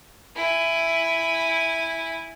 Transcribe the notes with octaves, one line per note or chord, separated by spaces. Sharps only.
E4 G#5